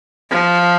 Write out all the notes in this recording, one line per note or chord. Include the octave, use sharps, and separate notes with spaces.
F3